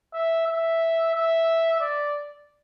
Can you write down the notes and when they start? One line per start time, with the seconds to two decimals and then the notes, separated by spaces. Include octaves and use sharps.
0.14 E5
0.47 E5
1.15 E5
1.80 D5